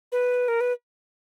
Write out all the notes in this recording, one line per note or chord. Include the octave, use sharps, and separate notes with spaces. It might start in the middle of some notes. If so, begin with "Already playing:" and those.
B4
A#4
B4